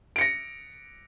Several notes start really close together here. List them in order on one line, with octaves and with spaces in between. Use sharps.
D7 C#7 A#6